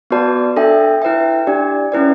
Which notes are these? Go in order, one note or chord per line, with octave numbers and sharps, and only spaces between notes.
B3 F#4 B4 D5 A5
D4 A4 E5 G5
E4 B4 E5 G5
D4 G4 D5
C#4 E4 B4 D5